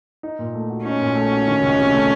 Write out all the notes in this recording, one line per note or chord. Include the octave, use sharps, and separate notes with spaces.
D#4
A#2
A3
F#4
C#4 D#4
A#2
A3
F#4
D#3
C#2
C3
A3